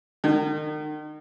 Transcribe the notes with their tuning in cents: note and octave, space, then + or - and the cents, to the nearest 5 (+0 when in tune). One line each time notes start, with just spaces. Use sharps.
D#3 -35